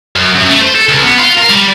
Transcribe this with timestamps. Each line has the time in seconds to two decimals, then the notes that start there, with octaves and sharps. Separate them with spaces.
0.16 F#2
0.35 F#2
0.49 A3
0.61 C5
0.75 A4
0.88 C#2
1.03 B3
1.19 F4
1.38 A#4
1.50 G3